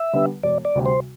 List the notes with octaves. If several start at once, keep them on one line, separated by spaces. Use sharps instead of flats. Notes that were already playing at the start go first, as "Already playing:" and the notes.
Already playing: E5
D3 G3 B3
E1 D5
D5
D2 C3 G3
C5